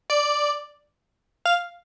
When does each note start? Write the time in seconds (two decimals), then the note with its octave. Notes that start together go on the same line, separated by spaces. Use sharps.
0.10 D5
1.45 F5